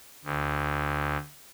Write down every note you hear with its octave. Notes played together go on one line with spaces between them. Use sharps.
D2